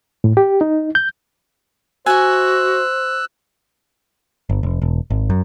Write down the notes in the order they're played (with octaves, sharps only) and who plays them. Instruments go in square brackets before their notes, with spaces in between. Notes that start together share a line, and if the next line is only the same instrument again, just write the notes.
[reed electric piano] A2
G4
D#4
G6
[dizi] F#4 [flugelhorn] C5 [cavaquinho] E5 G#5 [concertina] E6 F#6
[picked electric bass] G1
F1
E1
G#1
F#2